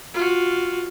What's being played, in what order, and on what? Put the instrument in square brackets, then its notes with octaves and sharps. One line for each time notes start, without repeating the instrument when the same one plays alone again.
[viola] F4 F#4